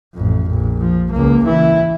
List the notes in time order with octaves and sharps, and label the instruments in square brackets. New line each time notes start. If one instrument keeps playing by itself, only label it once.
[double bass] A1 F2
A#1
F3
C#2 A#3
E3 E4